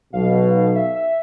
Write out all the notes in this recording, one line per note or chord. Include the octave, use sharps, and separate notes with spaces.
B1 B2 F5
E5
E5